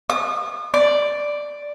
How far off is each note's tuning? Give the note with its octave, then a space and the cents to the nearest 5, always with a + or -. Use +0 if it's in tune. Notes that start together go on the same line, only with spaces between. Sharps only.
D#6 -40
D5 +0